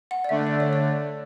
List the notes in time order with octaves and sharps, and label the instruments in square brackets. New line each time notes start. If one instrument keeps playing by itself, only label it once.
[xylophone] F#5
D5
[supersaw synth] D3 A3 D4 [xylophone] E5
[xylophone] D5
C#5
D5